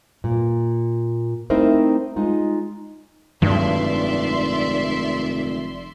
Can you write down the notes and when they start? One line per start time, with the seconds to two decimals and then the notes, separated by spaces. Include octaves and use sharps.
0.24 A#2
1.50 A3 C4 D#4 E4 A#4 C5
2.16 G#3 D#4 F4
3.42 F1 G2 D#3 F#3 G#3 D5 E5 C6